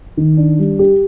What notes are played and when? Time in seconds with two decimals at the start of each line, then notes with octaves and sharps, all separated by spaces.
0.17 D#3
0.37 D4
0.59 G3
0.79 G4